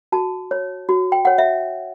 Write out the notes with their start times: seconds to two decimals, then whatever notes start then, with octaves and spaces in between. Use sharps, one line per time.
0.12 F#4 A5
0.51 C#5
0.89 F#4
1.12 G5
1.25 C#5 F#5
1.38 E5